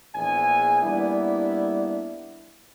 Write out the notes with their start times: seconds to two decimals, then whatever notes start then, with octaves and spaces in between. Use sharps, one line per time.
0.15 A#1 E2 G#4 G#5
0.82 G3 A#3 B3 D4 E4